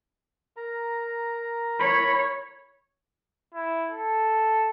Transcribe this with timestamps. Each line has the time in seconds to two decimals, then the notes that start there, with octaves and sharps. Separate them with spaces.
0.57 A#4 A#5
1.80 C#5 B5
3.54 E4
3.91 A4